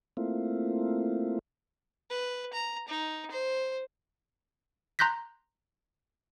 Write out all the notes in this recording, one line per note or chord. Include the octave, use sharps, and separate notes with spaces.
A3 A#3 C4 E4 F4
B4
A#5
D#4
C5
A#5 C6 F#6 G6 A#6 B6